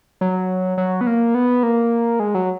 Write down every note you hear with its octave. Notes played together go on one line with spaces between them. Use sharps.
F#3
F#3
B3
A#3
B3
A#3
G#3
F#3